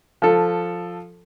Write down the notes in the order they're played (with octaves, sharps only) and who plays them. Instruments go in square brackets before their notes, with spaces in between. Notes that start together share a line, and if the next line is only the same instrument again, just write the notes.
[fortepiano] F3 A4